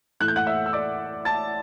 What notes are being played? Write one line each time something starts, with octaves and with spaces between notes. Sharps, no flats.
A2 E3 A3 F#6
G6
F#5 F#6
E5 E6
E6
D5 D6
A5 A6